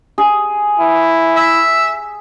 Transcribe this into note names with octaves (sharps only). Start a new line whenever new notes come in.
G#4
E4
E5